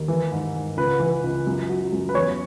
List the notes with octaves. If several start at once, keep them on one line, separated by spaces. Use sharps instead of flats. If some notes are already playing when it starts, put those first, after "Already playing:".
Already playing: D#2
E3
G#2
G#2
C#2 B4
E3
C#2
F#2
F#3
F#2
B4
E2 C#5